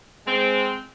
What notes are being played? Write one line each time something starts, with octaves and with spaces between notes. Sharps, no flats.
G#3 C4